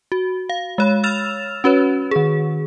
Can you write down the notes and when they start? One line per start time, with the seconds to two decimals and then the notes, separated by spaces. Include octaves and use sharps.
0.12 F#4
0.49 F5
0.78 G#3 C#5 B5
1.04 E6 F6 A6 E7 F7
1.64 C#4 F#4 B4 C#5
2.11 D#3 G#4